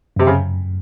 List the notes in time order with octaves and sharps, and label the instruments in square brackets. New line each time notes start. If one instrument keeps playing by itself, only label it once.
[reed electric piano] F#2 [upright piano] C3
[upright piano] C#3